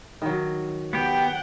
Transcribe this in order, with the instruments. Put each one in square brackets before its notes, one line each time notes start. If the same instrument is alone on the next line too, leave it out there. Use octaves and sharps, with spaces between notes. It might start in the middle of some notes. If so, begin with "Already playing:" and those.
[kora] D#3 F#3
[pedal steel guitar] B3 G4 [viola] F#5 G5